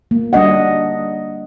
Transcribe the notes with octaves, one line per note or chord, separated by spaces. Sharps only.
A#3
G3 D4 D#5 F#5